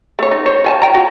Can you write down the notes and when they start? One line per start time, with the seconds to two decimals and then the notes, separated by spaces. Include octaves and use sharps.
0.19 A3 C#5
0.31 D#4
0.46 C5 C#5
0.64 F3 G#5 A5
0.82 G5 A#5
0.94 F#4